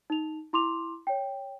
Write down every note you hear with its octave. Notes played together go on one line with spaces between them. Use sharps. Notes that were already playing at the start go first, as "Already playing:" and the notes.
D#4 F7
E4 C6 D6 F7
C#5 G5